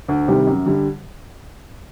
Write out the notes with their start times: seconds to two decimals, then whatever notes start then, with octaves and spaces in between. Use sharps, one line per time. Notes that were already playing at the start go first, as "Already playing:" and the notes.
0.08 D2
0.28 C3 D#3 G3
0.47 F#2
0.66 D3 G3